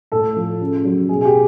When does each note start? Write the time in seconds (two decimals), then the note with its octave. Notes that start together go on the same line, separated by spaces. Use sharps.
0.12 A2 A4
0.36 F3
0.61 C#3
0.85 F#3
1.09 B2 G#4
1.21 G#4
1.25 G4